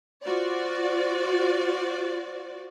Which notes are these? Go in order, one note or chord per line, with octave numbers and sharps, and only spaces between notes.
F4 F#4 C5 D5